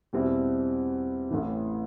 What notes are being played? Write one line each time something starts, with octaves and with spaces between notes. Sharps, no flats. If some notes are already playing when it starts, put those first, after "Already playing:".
E2 B2 G3 C4 E4
A1 A2 E3